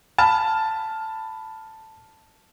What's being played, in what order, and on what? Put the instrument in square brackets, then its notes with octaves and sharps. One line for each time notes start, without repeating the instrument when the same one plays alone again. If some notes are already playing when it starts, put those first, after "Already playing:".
[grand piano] A5 B5 F6